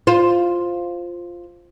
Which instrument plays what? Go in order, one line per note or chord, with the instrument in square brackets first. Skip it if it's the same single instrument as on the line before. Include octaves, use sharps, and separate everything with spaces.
[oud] F4 C5